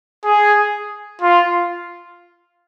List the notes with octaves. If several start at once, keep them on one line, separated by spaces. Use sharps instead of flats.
G#4
F4